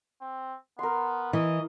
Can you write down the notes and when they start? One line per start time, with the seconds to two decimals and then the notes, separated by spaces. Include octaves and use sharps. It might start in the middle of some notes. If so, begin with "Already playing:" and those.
0.22 C4
0.79 B3 A#4 C6
1.33 E3 D#5